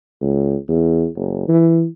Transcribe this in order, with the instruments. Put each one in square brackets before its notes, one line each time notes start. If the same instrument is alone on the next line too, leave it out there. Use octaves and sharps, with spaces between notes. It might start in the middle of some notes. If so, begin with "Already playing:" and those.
[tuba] C#2
E2
F#1
E3